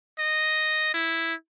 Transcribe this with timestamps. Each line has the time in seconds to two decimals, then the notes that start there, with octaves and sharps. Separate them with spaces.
0.19 D#5
0.94 E4